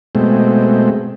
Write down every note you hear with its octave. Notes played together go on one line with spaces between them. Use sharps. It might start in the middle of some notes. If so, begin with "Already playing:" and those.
B2 G#3 A3 C4